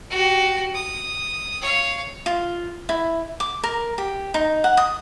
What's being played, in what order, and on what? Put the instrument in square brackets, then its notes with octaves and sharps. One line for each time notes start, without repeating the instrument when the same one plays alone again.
[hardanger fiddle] F#4 G4
D#6
C#5 F5
[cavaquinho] F4
E4
D6
A#4
G4
D#4
F#5
D#6